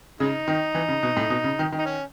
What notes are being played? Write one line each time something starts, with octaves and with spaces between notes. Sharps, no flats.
C#3 G#3 D#4
D#3
E3
C#3
B2
A2
B2
C#3
D#3
D#3
D#4
C#4